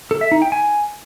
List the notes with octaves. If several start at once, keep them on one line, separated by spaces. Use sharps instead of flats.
A4
E5
D#4
G5
G#5